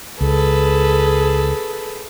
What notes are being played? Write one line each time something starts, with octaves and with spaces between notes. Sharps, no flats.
C#2 G#4 A4 B4